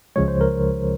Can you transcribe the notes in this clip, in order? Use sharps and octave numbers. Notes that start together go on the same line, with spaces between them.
C#2 C#3 F3 G#3 C#5
C5
A#4